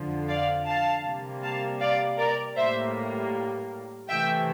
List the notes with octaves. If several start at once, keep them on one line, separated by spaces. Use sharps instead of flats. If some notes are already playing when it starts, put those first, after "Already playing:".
Already playing: F2 D3 F3
D5 F5
F5 A5
C3 G3 A#3
F5 A5
D5 F5
A#4 D5
A2 G3 A#3 C5 E5
C3 E3 A3 E5 G5